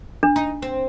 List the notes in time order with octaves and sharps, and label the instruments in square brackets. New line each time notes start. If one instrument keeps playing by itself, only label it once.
[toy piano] D4
[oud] D#4
C4